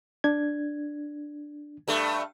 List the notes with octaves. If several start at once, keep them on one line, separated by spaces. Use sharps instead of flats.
D4 G#6
G2 A3